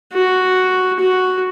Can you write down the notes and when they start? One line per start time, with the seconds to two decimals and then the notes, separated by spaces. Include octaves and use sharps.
0.13 F#4
1.00 F#4